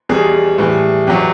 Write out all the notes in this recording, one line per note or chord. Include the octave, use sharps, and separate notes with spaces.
E2 B2 G3 G#4
A2 E3 G3
E2 B2 F#3 G4